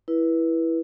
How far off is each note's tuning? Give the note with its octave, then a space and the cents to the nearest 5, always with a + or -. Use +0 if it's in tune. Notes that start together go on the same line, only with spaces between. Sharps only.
E4 +0 B4 -25